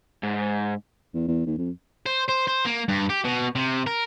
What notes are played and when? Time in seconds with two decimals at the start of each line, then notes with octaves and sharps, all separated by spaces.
0.23 G#2
1.14 E2
1.27 E2
1.46 D#2
1.58 F2
2.06 C5
2.29 C5
2.48 C5
2.65 A#3
2.88 G2
3.10 G4
3.24 B2
3.55 C3
3.87 A#4